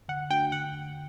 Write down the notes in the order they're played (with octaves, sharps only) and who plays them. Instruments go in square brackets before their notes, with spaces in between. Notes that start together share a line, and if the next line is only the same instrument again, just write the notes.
[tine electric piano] D3 [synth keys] F#5
[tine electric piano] A3 D4 F#4 [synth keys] G5
[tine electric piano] D3 [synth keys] F#5